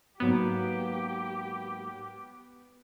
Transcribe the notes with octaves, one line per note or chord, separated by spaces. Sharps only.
G#2 F#3 A#3 B3 G4